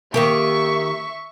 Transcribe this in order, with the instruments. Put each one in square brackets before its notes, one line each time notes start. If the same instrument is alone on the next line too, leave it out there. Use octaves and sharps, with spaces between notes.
[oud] D#3 A#3 G4 [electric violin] E5 C#6